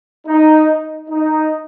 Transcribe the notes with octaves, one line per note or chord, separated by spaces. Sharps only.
D#4
D#4